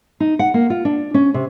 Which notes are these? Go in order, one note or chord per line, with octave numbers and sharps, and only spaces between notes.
D#4
F#5
A#3
F4
D4
C#4
C3